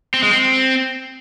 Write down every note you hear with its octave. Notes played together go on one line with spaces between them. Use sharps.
C4
G#3
C4